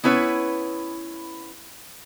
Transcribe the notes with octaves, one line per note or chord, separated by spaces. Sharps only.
B3 C#4 E4 B4 C#5